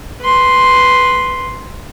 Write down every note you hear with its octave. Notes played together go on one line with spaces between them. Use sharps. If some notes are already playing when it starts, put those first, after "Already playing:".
B4 C6